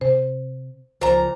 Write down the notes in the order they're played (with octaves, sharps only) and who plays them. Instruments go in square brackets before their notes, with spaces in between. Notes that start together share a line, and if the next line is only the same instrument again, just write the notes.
[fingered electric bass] C3 [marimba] C5
[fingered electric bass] C#2 F3 [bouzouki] A#2 A#5 [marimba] C5